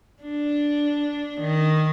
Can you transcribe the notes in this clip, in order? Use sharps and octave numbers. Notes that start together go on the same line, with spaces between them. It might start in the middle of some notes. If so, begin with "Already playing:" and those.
D4
D#3